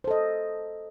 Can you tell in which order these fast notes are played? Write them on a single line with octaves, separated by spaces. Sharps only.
C5 A4 D#5